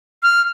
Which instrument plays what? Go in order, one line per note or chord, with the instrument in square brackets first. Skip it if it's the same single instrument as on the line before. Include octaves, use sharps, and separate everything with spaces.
[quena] F6